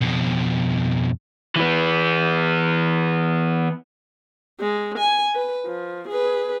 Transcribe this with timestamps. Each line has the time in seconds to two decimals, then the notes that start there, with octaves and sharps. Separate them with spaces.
0.01 F2 B2
1.56 E3 B3
4.60 G#3
4.98 G#5
5.35 B4
5.66 F3
6.09 G#4 B4